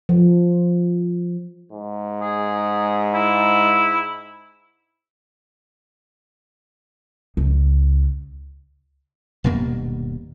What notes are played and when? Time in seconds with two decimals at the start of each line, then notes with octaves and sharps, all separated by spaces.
0.09 F3
1.72 G#2
2.21 G#4
3.13 E4
7.37 C#2
9.44 D#1 G2 B2 A#3